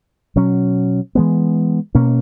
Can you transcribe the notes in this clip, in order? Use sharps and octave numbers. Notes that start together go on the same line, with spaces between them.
B2 F#3 C#4
E3 G#3 B3
B2 A#3 C#4